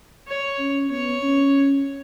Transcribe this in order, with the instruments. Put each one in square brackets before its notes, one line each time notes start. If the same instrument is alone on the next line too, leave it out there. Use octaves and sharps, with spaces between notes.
[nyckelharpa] C#5
[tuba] C#4
[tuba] B3 [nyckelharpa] C#5
[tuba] C#4